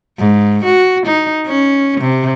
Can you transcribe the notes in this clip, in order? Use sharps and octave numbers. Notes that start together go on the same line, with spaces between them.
G#2
F#4
D#4
C#4
C3